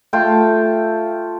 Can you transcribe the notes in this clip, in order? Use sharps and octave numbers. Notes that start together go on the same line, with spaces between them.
A3 F4 G5 A5